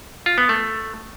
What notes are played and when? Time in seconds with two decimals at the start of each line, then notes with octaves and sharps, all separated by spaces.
0.26 F4
0.38 B3
0.49 A3